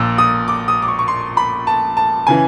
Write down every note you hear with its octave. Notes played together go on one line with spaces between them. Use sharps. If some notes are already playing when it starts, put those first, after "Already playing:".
Already playing: A#1 A#2 E6
D#6
D6
D#6
D6
C#6
C#6
C6
B5
A5
A5
C#3 E3 G#5